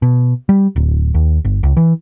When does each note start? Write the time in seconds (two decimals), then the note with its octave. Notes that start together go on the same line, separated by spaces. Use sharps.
0.02 B2
0.49 G3
0.76 D1
1.14 D#2
1.45 G1
1.63 C#2
1.77 E3